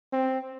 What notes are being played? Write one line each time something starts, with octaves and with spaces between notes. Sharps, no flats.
C4